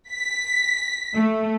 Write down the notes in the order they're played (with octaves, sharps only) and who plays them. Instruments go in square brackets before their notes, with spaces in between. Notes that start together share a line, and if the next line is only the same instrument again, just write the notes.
[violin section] B6
[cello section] A3